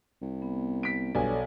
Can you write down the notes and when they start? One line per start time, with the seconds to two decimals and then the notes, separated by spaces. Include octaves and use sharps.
0.22 C2
0.42 B3
0.83 B6 D7
1.15 B1 G2 A4 C#5 D5 G#5